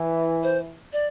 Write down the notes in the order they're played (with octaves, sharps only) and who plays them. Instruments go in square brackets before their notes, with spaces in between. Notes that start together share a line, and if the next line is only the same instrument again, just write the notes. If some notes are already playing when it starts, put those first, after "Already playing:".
Already playing: [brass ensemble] E3
[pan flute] C5
D5